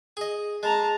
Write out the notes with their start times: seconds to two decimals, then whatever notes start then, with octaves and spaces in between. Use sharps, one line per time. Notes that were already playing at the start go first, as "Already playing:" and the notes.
0.17 G#4 D#5
0.63 G#3 A5 A#5